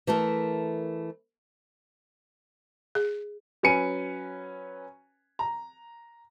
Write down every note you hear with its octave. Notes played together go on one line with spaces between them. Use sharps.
E3 A3 A4 A#4
G#4
F#3 C#4 B4 G#5 C#7 D#7
A#5